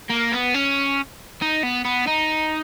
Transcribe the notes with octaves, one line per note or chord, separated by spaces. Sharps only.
A#3
B3
C#4
D#4
B3
B3
D#4